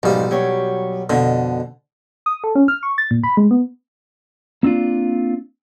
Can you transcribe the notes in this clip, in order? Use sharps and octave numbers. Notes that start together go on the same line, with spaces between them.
B1 G#2 F3 G3
F#3 G4 C#5
F2 B2 D3
D#6
A4
C#4
F6
C#6
A6
A#2
B5
G#3
B3
A#3 C4 D4 F4